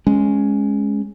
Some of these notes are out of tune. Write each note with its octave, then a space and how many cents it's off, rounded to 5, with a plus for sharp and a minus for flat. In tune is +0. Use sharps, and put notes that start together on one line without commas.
G#3 +0 C#4 +0